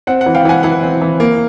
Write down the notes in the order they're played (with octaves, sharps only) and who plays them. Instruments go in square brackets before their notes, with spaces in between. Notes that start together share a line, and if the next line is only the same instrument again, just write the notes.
[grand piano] C4 F#5
F#5
E3
F5 G5
E3 F#5 G#5
E3 F#5
C4
E3
A#3